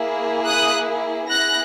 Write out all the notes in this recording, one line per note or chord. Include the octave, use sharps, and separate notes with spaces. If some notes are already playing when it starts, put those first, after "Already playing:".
Already playing: A#3 E4 G#4
D#6 F#6
B3 E4 G#4 F#6 A#6